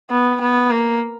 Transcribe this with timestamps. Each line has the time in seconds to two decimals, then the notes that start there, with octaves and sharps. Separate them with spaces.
0.11 B3
0.41 B3
0.71 A#3